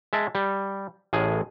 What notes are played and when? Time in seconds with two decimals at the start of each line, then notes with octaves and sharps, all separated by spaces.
0.13 G#3 E5 A5
0.35 G3
1.13 A1 A2 G#4